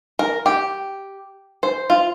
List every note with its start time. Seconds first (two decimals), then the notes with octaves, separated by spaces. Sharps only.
0.19 A#4
0.46 G4
1.63 C5
1.90 F4